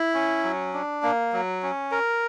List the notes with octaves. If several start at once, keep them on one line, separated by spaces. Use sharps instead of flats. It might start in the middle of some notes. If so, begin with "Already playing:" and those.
Already playing: E4
C#4
F#3
D4
A#3
F#3
C#4
A#4